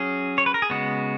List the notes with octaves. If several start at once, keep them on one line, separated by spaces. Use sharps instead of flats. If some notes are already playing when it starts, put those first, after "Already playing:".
Already playing: F#3 C#4 G#4
C#5
B4
A#4
G#4
C#3 G#3 B3 F#4